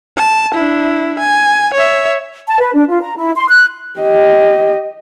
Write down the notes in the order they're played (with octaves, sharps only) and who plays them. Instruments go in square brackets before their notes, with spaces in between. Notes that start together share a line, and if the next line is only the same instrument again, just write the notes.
[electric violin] A5
D4 E4
G#5
C#5 E5
[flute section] A5
B4
D4
F4
A#5
E4
C6
F#6
[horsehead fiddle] G4 D#5